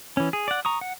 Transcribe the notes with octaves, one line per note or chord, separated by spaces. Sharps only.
E3 C#4
G#4
D5 F#5
A#5 C#6 D#6
F#5